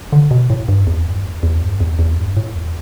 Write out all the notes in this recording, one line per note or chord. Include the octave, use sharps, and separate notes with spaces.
D3
B2
A2
G2
E2
G2
E2
E2
G2
E2
E2
G2
A2
E2